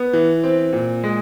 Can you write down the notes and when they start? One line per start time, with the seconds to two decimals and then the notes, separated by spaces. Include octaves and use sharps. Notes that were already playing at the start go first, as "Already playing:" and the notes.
Already playing: B3
0.13 E3
0.44 C4
0.73 A#2
1.04 G#3